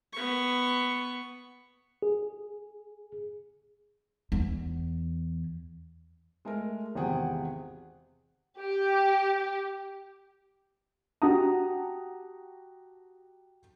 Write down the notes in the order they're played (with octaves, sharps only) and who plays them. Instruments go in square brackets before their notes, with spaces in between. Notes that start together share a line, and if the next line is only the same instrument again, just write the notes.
[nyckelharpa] B3 C#6
[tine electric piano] G#4
[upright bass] E2
[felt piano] G#3 A3 A#4
G#1 E2 C3 G#4 F#5 G5
[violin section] G4
[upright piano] F#4 G4 F#5 A5 A#5 D#6